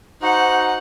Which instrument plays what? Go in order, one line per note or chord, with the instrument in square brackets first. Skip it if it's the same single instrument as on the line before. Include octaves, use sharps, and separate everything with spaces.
[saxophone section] D#4 F#4 C5 [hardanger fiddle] F#5